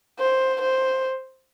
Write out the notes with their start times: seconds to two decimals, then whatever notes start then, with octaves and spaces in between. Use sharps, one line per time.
0.19 C5
0.61 C5